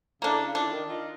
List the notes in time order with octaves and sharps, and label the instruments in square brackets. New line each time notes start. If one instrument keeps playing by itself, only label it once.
[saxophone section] C#3 E4 A4 [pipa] A#3 D4
[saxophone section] D#3 E4 F4 [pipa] D4
[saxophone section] D#3
D#4 F4